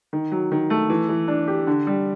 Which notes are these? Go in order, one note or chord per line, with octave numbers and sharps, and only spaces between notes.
D#3
F#3
D#3
A3
E3
E3
D4
G4
D3
G3